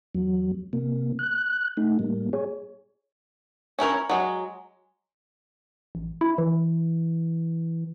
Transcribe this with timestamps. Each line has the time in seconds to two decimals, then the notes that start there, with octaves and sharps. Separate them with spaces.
0.15 E2 F#3
0.73 C3 A#3
1.19 F#6
1.77 A3 D#4
1.99 A2 G3 A#3
2.33 G#4 C#5
3.79 C#4 E4 A#4 C#5
4.09 F#3 G#3
5.95 A1
6.21 E4
6.38 E3